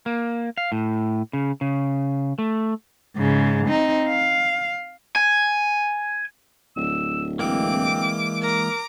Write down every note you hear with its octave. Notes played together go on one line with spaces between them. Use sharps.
A#3
F5
A2
C#3
C#3
A3
G#2 C#3
C4 D#4
F5
G#5
D1 E6
E3 G#3 A#3 C4 D6
A#4 A#5 D6